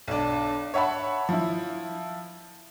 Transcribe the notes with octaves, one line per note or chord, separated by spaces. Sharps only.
B1 D4
C#5 E5 F#5 A5 B5
F3 E4